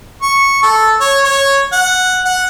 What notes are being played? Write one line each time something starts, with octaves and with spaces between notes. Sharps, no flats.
C#6
A4
C#5
C#5
F#5
F#5